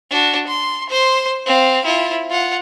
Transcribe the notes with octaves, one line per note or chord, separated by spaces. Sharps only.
D4 F#4
C6
C5 C6
C4 F5
E4 F4
F4 F#5